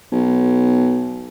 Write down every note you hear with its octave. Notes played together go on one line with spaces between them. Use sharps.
B1